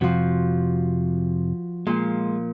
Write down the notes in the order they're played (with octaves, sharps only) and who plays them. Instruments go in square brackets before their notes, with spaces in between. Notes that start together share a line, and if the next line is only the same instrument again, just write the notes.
[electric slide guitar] F2 C3 [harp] F3 F#4
[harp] A#2 F3 [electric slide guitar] G#3